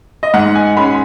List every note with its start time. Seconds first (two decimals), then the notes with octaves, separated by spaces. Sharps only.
0.23 D#5
0.34 G#2 F#5
0.55 G#5
0.77 G#3 C#4 B5